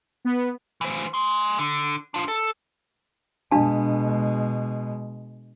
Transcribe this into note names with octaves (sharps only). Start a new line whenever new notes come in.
B3
E3 C5
G#5 C6
D3
D4 F4
A4
B2 G#3 D4 F5 A5